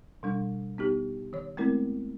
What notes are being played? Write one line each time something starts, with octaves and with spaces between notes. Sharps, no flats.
B2 G3 D4
B3 D#4 G4
D#3 C#5
G#3 A3 B3 C4 E4 A#4